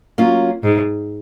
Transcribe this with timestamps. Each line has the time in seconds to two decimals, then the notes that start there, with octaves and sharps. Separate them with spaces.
0.18 F#3 A#3 C#4 F4
0.64 G#2